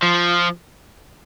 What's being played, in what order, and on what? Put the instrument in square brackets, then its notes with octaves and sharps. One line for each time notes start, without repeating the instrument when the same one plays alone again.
[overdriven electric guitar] F3